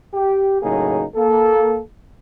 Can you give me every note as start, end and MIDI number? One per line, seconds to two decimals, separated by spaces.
0.14 0.62 67
0.62 1.05 45
0.62 1.05 49
0.62 1.05 54
0.62 1.05 58
0.62 1.05 63
0.62 1.05 68
1.15 1.79 58
1.15 1.79 69